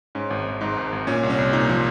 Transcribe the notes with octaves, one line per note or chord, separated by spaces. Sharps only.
G#2 C#4
G#1
G#1
G#2 D#4
G#1
G#1
A#2 C#4
C2
C#4
C2
A#2 D#4
F3